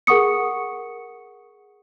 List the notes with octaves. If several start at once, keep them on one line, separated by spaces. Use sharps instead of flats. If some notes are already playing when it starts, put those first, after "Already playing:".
G#4 A#4 F#5 C#6 D#6 C#7